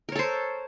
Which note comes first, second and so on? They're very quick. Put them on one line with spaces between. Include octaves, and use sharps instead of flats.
A#4 C#5 A4 C5